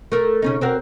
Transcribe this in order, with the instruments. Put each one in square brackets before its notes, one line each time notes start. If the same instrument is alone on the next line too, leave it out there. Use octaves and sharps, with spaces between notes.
[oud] A3 A#4
C#3 C#4 D#4
C4 F#4 A#4